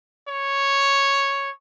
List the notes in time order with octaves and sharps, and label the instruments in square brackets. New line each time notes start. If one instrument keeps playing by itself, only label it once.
[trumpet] C#5